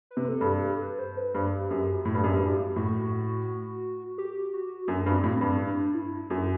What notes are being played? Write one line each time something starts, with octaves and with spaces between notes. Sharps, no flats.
B4
C3
A4
G2
G4
A4
B4
C5
B4
G2 G4
F#2
A2
G2
F#2
G2
A2 F#4
G4
F#4
F#2 D4
G2
C4
A2
C4
G2
D4
E4
F#2 F#4